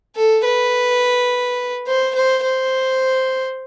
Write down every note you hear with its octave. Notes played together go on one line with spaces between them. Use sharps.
A4
B4
C5
C5
C5